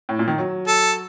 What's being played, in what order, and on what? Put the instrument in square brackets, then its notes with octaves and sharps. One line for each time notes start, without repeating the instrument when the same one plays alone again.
[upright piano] A2
A#2
D#3
F#3
[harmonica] A4